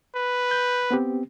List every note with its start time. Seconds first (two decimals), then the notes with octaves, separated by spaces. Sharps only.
0.15 B4
0.51 G6
0.91 B3 C4 G4